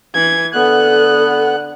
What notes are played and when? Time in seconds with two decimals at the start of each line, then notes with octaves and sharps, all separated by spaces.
0.14 E3 G#6
0.54 D3 B3 A4 F#6